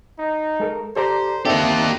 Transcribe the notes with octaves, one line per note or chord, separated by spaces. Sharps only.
D#4
G#3 A4 A#4
G4 A4 C5 D5 A#5
A#3 C4 D#4 G4 A4 D5 E5